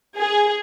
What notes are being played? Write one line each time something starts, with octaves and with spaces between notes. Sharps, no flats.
G#4